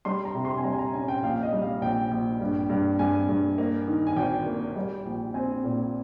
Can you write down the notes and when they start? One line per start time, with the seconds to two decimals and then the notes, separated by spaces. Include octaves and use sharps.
0.05 G3 C6
0.25 A#5
0.35 C3
0.45 C6
0.57 G#5
0.64 G3 A#5
0.73 G#5
0.79 A#5
0.94 C#4 G#5
1.08 G5
1.23 A#1 F5
1.43 D#5
1.53 G3
1.62 F5
1.82 A#1 G5
2.11 A#1
2.41 G2
2.70 G2
2.99 G2 G#5
3.29 G2
3.58 A#3
3.88 D#3
4.07 G#5
4.16 G#1 G5
4.46 A#3
4.76 G3
5.05 A#1
5.34 C4 G#5
5.64 A#2